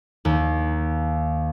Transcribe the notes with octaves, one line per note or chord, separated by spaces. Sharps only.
D#2